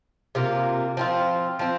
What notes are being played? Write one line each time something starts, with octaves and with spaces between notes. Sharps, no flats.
C3 A#3 F4
F3 C4 F4
F3 C4